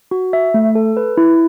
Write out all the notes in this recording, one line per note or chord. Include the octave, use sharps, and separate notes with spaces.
F#4
E5
A3
A4
B4
E4